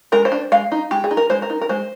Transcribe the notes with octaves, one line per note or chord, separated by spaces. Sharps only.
G#3 A#4
C5
D4
G#3 F5
D#4
G#3 G4
G#4
D#4
A#4
G#3 C5
A#4
D#4
A#4
G#3 C5